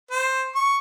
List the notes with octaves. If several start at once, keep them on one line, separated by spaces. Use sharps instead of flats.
C5
C#6